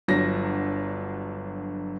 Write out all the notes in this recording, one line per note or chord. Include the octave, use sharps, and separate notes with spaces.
G1 F#3 D4 A#6